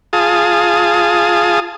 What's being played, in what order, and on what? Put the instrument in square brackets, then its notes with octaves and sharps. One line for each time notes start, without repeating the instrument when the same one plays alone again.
[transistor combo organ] F4 G#4 A5 D#6